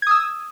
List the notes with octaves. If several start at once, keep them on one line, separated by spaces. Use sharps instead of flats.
D#6 E6 G#6